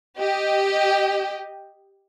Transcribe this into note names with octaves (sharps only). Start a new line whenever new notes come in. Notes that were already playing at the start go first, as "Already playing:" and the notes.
G4 D#5